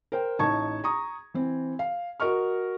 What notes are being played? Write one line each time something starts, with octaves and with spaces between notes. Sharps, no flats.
A#4 C5 G5
A1 D#4 A5 C#6 G#6
A#5 C#6 D#6
E3 C4
F5
F#4 A#4 D#5 C#6 F6